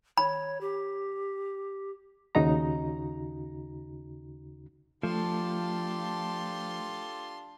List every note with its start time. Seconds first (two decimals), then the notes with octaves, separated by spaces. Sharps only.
0.18 C#5 B5
0.61 G4
2.35 D#2 C#3 D#4 F#4 A#5
5.03 F3 A3 D4 F4 G4 A4 C6